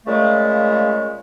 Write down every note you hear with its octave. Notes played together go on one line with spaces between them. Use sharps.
A#2 C#3 G#3 A3